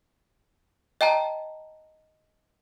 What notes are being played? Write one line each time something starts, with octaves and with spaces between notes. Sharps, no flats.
D#5 G5 A5 A#5